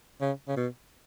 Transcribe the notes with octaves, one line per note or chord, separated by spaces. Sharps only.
C#3
C#3
B2